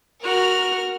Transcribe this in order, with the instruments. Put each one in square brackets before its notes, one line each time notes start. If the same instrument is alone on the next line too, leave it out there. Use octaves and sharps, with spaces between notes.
[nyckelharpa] F#4 [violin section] A#4 F6